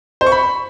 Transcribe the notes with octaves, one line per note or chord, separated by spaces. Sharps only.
C5
C#6
B5